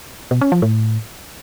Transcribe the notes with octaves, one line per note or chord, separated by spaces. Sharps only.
B2
C#4
F3
A2